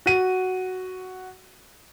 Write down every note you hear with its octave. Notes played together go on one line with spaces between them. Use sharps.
F#4 D#7